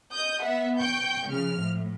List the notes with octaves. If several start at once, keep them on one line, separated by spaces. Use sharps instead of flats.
D#5 D#6 G6
B3 E5 F#5
G5 C#6 G6
C#3 F3 F6
A2